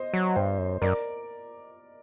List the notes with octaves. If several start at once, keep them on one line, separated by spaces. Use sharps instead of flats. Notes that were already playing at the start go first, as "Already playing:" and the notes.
Already playing: C5 D#5
F#3
G2 C5
F#2
F#2 A#4 D5